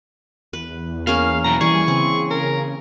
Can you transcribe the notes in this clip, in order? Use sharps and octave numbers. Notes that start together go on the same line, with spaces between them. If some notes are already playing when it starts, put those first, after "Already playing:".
E2 B4
A#3 C#4 G#4 F5
B1 E3 A#4 A#5
E3 G3 G#4 C#6
C#3 C4
A#4